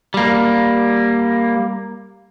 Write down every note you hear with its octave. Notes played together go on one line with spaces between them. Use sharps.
G3 A#3